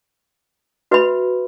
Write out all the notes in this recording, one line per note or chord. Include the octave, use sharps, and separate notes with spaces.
F#4 B4 E5 B5